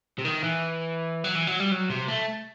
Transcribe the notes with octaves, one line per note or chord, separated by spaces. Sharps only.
C3
D#3
E3
F#3
E3
F#3
G3
F#3
C3
A3